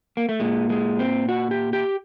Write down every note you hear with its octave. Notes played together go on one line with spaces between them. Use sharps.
A#3
A3
A#2 G#3
G#3
C4
F#4
G4
G4